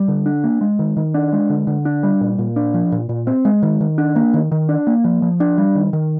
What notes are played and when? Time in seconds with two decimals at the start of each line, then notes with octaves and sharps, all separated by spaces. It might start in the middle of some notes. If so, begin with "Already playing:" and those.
Already playing: G3
0.08 D3
0.26 D4
0.44 A#3
0.61 G#3
0.79 D#3
0.97 D#3
1.14 D4
1.32 G#3
1.50 D3
1.67 D3
1.85 D4
2.03 G3
2.21 A#2
2.39 A#2
2.56 D4
2.74 F3
2.92 A#2
3.09 A#2
3.27 C4
3.45 G#3
3.62 D#3
3.81 D#3
3.98 D4
4.16 A#3
4.34 D#3
4.52 D#3
4.69 D4
4.87 A#3
5.04 F3
5.22 F3
5.40 D4
5.58 G3
5.75 D#3
5.93 D#3